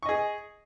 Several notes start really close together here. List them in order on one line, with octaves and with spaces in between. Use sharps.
C#6 D#5 G#4